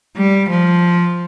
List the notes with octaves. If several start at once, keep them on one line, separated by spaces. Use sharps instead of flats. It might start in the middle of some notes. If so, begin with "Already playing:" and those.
G3
F3